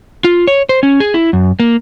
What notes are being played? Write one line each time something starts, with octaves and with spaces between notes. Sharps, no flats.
F4
C#5
C5
C#4
G#4
E4
F#2
A#3